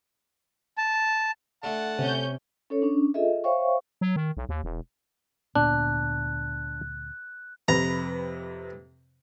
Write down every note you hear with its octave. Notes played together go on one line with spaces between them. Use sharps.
A5
D3 A3 F#5 A5
C3 C#4 G6
C#4 A4 C#5
C#4 D4
F4 G#4 A4 D#5 E5
C5 C#5 E5 F5 G5 C#6
F#3
D#3
B1
D#2
E1
D2 A#2 B3 D4 F#6
F2 C3 B4 A#5